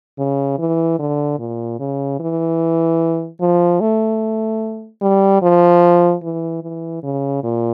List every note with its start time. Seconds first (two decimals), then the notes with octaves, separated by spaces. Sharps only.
0.18 C#3
0.59 E3
0.99 D3
1.39 A#2
1.79 C#3
2.20 E3
3.41 F3
3.80 A3
5.02 G3
5.42 F3
6.23 E3
6.63 E3
7.03 C#3
7.43 A#2